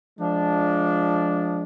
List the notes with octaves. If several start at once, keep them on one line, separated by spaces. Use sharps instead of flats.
F3 G#3 D4